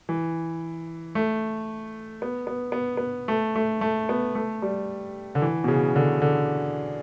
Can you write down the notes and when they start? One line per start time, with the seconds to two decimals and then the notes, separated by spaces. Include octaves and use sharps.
0.09 E3
1.15 A3
2.22 B3
2.47 B3
2.72 B3
2.97 B3
3.28 A3
3.55 A3
3.81 A3
4.09 B3
4.35 A3
4.62 G3
5.35 D3
5.42 E3
5.64 B2
5.68 C#3
5.96 D3
6.22 D3